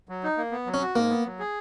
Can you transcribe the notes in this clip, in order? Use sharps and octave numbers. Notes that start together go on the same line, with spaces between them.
F#3
D#4
A#3
B3
F#3
C#4
F#4
G#2 A#3
B3
F#3
G#4